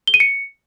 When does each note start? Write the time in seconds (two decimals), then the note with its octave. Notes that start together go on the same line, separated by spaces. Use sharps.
0.07 G7
0.14 D#7
0.20 C#7